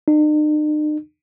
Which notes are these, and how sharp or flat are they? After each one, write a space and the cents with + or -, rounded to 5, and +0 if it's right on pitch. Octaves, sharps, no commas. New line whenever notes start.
D#4 -45